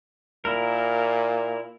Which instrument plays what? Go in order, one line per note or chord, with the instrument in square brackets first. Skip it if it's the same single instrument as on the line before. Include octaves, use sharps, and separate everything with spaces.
[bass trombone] A#2 [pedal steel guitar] E4 A#4